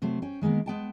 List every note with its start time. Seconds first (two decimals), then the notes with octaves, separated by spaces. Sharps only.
0.02 C3 F#3 A3 C5
0.22 C#4 C5 G5
0.41 D#3 G#3 A#3 B3
0.66 G#3 B3 G5 A5